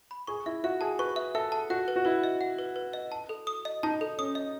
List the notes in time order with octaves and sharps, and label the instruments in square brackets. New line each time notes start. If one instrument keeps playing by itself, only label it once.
[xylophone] B5
[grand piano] G#4 [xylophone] C#6
[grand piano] E4 [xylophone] E5
[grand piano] F#4 [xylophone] E5
[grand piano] G#4 [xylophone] A5
[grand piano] B4 [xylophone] C#6
[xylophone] E5
[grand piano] A4 [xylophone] E5
[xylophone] A5
[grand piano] F#4 [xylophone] F#5
[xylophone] B4
[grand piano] F#4
[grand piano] E4 [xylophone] B4
[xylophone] D#5
F#5
B4
B4
D#5
A5
A4
D#6
D#5
[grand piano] D#4 [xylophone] A5
[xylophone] A4
[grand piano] C#4 [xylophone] D#6
[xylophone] D#5